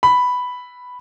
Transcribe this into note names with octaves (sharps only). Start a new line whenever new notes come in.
B5